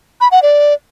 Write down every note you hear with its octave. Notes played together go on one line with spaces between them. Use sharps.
B5
F#5
D5